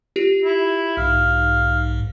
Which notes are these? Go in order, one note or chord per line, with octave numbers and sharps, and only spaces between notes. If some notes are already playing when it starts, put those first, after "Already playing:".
F4 G4
E4
B1 G#2 F5